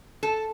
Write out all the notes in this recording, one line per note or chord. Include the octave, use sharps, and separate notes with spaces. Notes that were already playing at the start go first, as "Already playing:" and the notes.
A4